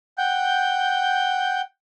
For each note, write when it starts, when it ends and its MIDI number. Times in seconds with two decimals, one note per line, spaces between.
0.18 1.61 78
0.18 1.61 79
0.18 1.61 91